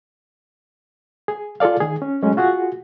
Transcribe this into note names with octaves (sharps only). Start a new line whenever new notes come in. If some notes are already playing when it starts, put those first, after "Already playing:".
G#4
F4 G#4 A4 D5 F5
D#3 G#4
C#4
F#3 G#3 A3 C#4
F4 F#4 G#4 F#5